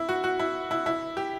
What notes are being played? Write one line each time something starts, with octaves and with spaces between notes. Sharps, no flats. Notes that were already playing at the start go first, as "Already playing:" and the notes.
Already playing: E4
F#4
F#4
E4
E4
E4
G4